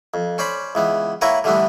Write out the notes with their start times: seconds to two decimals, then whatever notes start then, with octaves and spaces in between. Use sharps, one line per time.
0.14 F2
0.38 C#4 C5 D5 B5
0.75 C#2 E3 B3
1.21 A#3 E4 A#4 B4 C#5 F#5
1.44 D3 E3 G3 A3 B3 D4